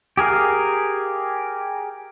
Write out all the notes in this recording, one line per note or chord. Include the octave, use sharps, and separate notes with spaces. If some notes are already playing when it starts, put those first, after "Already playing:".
G4 G#4 A#4 F5